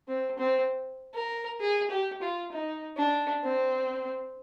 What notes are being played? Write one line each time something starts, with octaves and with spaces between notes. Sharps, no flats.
C4
C4
A#4
G#4
G4
F4
D#4
D4
C4